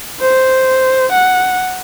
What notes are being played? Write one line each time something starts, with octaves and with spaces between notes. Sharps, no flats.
C5
F#5